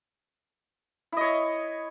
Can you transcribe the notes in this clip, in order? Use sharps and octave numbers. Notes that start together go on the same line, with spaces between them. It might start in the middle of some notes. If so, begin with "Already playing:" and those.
E4 C#5 D#5